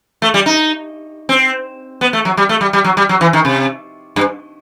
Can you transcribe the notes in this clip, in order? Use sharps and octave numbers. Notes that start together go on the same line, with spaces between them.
A3
G3
D#4
C4
B3
A3
F#3
G3
A3
G3
G3
F#3
G3
F#3
E3
D#3
C3
G2